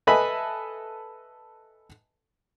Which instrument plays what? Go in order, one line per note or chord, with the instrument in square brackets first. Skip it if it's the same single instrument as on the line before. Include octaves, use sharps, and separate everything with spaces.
[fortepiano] A4 B4 D#5 E5 G#5 B5